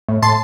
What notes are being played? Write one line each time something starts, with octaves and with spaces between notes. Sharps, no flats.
A2
A2 A5 C6